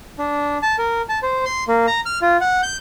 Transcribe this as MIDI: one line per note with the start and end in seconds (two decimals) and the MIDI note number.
0.18 0.58 62
0.62 0.76 81
0.78 1.02 70
1.09 1.19 81
1.22 1.45 72
1.45 1.64 84
1.68 1.86 58
1.87 2.00 82
2.06 2.19 89
2.22 2.37 65
2.41 2.61 78
2.63 2.77 91